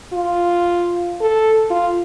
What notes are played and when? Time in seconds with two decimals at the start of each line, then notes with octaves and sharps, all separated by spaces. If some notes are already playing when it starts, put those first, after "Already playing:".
0.13 F4
1.21 A4
1.70 F4